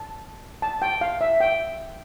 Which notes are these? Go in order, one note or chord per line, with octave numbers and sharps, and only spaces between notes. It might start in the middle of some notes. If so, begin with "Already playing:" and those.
Already playing: A5
A5
G5
F5
E5
G5